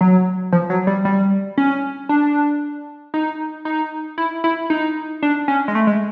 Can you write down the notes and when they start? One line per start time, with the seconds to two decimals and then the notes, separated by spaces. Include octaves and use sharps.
0.01 F#3
0.52 F3
0.70 F#3
0.87 G3
1.05 G3
1.58 C#4
2.09 D4
3.14 D#4
3.65 D#4
4.18 E4
4.44 E4
4.70 D#4
5.23 D4
5.48 C#4
5.68 G#3
5.75 A3
5.87 G#3